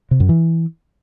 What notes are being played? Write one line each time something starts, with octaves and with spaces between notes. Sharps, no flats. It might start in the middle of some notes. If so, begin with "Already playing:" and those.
C3
F#2
E3